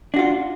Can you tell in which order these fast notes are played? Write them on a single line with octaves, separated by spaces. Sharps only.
D4 F#4 F4